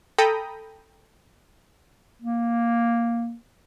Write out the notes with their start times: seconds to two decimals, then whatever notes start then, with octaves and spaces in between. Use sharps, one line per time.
0.18 A4 G5 A#5 B5 D#6
2.22 A#3